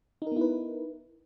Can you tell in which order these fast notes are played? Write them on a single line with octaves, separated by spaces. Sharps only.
D#4 A#4 B3 E4 B4